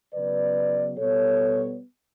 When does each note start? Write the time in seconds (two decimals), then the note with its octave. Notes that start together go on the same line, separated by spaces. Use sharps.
0.14 C#3 F#3 B3 B4 D5
0.98 B2 G3 B3 A4 C#5